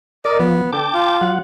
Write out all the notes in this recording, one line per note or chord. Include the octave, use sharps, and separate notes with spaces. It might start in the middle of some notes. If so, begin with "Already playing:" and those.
A#4 D5 D#5
F3 B3
D3 G5 A5 D6
F4
F#3 F#5